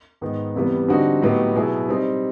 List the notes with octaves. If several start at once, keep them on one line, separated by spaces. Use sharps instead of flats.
G#2 D#3 G#3 B3 D#4
E2 C3 E3 G3 B3
D3 G3 C4 D#4 F#4
A2 F#3 B3 D#4 G4
B2 F#3 B3 E4 G#4
G3 C4 D#4